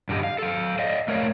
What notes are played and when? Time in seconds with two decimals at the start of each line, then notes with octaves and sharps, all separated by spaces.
0.09 G2 D3 G3 G4 D#5
0.23 F5
0.39 A4 F5
0.79 D5 D#5 F5
1.08 A3 A#4 C#5 F5